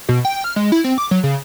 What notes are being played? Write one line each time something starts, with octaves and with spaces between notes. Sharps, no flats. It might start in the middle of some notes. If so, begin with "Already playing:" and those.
B2
G5
F6
G#3
E4
C4
D6
F#3
C#3